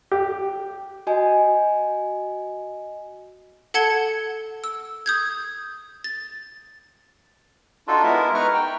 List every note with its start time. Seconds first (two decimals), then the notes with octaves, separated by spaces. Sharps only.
0.12 G4
1.07 F#4 D#5 G#5
3.74 A4 F#5 A5 G#6 C#7 G7
4.64 E6
5.06 D#6 G6 G#6
6.04 A6
7.88 D4 D#4 F4 F#4 A4
8.03 G#3 B3 E4 A#4 E5
8.35 D#4 B4 A#5 C#6 F6
8.54 G5